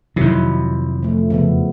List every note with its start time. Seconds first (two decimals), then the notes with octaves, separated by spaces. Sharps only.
0.16 F2 C3 D#3 F#3 E4
1.03 F3 A3
1.30 C#3 F3 B3